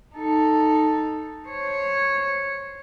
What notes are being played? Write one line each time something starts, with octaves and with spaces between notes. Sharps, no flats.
D#4 A4
C5 C#5